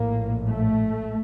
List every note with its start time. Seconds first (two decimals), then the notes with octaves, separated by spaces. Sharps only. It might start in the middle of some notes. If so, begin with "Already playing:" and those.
Already playing: A#1 A2 A#3
0.47 A3